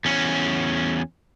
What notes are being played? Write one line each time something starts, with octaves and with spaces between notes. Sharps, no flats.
E2 C#4